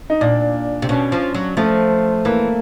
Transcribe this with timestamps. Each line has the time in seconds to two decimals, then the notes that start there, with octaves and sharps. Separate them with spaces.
0.10 D#4
0.21 A#2 D4
0.82 C3
0.89 B2 C#4
1.12 F3
1.34 F#3
1.57 F3 A3
2.25 E3 A#3